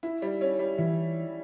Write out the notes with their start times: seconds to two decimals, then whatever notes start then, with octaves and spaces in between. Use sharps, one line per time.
0.03 E4
0.22 G3
0.41 C#4
0.59 G3
0.78 E3 E4